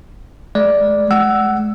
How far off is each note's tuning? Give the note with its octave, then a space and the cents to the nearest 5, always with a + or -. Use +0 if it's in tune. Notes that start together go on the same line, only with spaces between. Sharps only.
G#3 +40 D5 +0
G#3 +40 F#5 +15 E6 +0